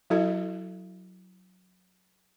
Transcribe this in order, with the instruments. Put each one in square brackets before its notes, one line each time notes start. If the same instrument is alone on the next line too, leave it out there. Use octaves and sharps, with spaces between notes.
[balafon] F#3 E4 F#4 A4 D#5